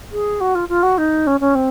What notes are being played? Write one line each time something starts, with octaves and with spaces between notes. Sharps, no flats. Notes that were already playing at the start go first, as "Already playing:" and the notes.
G#4
F#4
F4
F4
F#4
D#4
C#4
C#4
C4